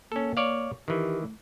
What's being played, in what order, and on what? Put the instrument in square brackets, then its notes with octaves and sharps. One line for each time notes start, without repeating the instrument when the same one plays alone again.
[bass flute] A#3 [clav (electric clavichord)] C#4 A4
[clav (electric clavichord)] C#5 D5 F5
[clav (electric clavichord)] D#3 E3 [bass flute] G4
[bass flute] A3